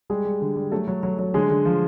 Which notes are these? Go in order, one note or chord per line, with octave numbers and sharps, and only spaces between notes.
G3 G#3 G#4
G3
D3
G3
F#3 A3 A4
F#3
F#3
F#3
D3 G#3 G#4
D3
F3